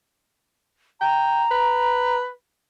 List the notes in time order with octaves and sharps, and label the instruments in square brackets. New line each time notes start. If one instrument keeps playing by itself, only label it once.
[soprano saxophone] G5 [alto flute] A#5
[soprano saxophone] B4